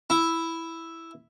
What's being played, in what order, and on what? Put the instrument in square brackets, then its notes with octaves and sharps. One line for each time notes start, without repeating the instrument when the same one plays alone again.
[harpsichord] E4